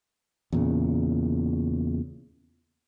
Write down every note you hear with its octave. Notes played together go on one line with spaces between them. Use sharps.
E2 A#2 C#3